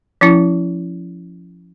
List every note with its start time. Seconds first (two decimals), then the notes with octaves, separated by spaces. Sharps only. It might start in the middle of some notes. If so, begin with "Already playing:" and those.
0.21 F3 C#4 E4